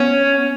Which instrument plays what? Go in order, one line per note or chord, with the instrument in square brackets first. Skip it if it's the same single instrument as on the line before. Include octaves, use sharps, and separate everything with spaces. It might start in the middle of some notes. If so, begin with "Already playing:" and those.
Already playing: [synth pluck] B3 [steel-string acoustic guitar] C#4